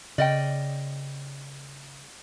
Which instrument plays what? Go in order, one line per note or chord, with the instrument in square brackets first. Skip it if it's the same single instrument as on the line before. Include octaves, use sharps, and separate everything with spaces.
[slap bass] C#3 [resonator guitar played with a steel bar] D5 D#5 G5